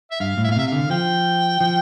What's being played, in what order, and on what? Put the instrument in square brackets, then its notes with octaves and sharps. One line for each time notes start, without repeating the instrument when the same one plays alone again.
[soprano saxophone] E5
[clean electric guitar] G2 [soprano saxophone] F5
[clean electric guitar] A2
[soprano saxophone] E5
[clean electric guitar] A#2
[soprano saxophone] F5
[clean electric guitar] C3 [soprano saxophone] E5
[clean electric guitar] D3 [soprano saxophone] F5
[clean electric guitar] F3 [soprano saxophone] G5
[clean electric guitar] F3